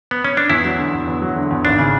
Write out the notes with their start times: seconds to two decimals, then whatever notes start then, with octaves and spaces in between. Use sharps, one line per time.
0.11 B3
0.24 C#4
0.37 D4
0.50 E2 E4
0.65 F#3
0.78 D3
0.93 E2
1.07 E2
1.22 F#3
1.36 D3
1.51 E2
1.65 G#1 D4
1.78 C#3